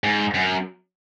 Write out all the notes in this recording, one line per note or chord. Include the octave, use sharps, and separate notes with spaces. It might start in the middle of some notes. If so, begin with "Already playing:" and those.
G#2
F#2